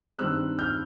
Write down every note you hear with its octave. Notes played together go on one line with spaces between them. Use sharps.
G2 D#3 G3 C4 E6 F#6
F6 G6